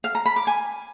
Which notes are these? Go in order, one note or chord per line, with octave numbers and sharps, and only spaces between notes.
F5
A#5
B5
D6
G#5